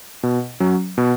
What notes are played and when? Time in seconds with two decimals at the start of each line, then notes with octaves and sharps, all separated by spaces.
0.23 B2
0.60 F#3 C#4
0.98 B2